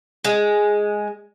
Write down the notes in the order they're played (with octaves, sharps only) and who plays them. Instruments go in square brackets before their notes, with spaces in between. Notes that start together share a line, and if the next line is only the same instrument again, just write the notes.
[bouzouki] G#3